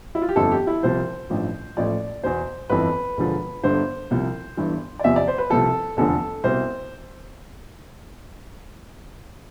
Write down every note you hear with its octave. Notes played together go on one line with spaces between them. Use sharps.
E4
F4
G4
G1 F2 D3 F3 A4
G4
E4
C2 C3 F3 C5
A1 G2 F3
A1 A2 F3 D5
E2 B2 C5
G1 F2 E3 B4
E1 E2 D3 F3
G1 G2 D3 C5
C2 C3 F3
G1 G2 E3
D5
E2 C3 F3 E5
D5
C5
B4
C2 C3 F3 A4
F1 E2 D3 F3 A4
C2 B2 C5